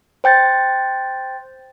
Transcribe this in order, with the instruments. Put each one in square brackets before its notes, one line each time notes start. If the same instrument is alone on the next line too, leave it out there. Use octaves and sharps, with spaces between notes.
[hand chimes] C5 G5 G6 A6